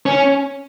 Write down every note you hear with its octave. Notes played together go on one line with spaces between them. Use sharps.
C#4